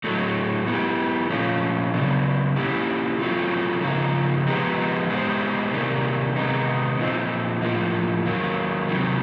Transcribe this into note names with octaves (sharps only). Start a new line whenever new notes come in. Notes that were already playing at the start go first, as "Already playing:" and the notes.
A2 F#3 A3
B3 E4 G4
A#2 F3 A3 C#4 F4
C#3 F#3 B3 D4
A#3 C#4 E4 G4
F#3 A3 C4 F4
C#3 F3 A#3 D#4
F3 G#3 B3 D#4 G4
G#3 B3 D#4 G4 C5
C3 D#3 G3 A#3
C3 D#3 G#3 B3 D#4
A#2 F3 G#3 C4 D#4
A2 F3 A#3
D#3 F#3 A#3
C3 D#3 F#3